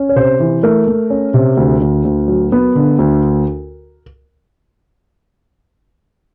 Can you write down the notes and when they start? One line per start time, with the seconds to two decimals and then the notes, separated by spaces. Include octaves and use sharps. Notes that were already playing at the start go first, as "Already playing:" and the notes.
Already playing: C#4
0.09 C#5
0.16 C3 C5
0.40 E3
0.63 A3 A#4
0.87 A3
1.10 C#4
1.34 C3
1.57 D2
1.82 D2
2.04 D2
2.28 F#3
2.52 B3
2.75 D3
2.99 D2